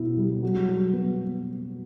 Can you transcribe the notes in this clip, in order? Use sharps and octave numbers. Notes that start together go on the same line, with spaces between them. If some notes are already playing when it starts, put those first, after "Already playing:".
Already playing: B2 B3 E4
G3
F#3
F#3
B3